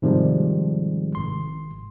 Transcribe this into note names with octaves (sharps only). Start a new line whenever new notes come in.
G#2 C3 D#3 F3 G3 G#3
G#1 C6